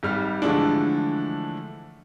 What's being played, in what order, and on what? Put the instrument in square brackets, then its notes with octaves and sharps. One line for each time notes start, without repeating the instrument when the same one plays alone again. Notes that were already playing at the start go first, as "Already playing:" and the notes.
[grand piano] G#1 G3 F6
D3 E3 F3 G#3 A3 D4